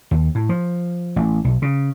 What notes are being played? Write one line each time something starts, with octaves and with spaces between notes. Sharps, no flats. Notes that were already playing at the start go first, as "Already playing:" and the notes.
D#2
A2
F3
A1
B1
C#3